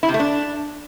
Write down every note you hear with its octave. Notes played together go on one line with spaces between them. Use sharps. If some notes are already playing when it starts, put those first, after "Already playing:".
E4
C3
A3
D4